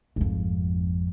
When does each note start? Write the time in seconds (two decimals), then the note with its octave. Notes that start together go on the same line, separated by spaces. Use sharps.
0.16 G#1 F2